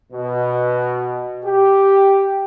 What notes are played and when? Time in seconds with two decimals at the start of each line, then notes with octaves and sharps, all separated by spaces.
0.12 B2
1.45 G4